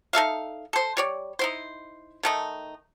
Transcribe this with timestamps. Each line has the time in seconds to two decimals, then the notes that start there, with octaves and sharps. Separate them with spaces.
0.13 D#4 A4 E5 F5
0.73 A4 C5
0.97 G3 C#5 D5
1.39 D#4 E4 C5
2.23 D#3 A3 D#4